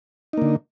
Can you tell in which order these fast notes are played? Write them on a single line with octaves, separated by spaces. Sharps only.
D#4 A#3 D3